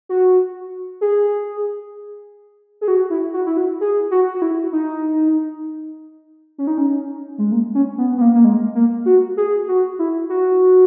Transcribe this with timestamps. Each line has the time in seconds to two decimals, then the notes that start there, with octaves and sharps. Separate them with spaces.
0.09 F#4
1.01 G#4
2.81 G#4
2.88 F#4
3.10 E4
3.33 F#4
3.46 E4
3.57 F#4
3.81 G#4
4.11 F#4
4.35 F#4
4.42 E4
4.72 D#4
6.58 C#4
6.67 D#4
6.78 C#4
7.38 G#3
7.52 A#3
7.75 C#4
7.98 B3
8.17 B3
8.21 A#3
8.34 A#3
8.45 G#3
8.75 A#3
9.06 F#4
9.37 G#4
9.68 F#4
9.99 E4
10.29 F#4